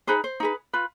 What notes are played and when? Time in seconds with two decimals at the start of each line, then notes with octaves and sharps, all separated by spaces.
0.07 D#4 G#4 B4 C5
0.24 C5
0.40 D#4 G#4 B4
0.73 F4 B4